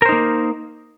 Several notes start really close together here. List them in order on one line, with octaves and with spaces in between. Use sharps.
A#4 C5 D#4 A#3